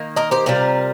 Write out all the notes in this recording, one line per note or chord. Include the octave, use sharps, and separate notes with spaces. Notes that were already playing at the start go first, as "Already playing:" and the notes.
Already playing: D#3 A#3
A#4 D#5
G4 C5
C3 G3 C4 F4 A#4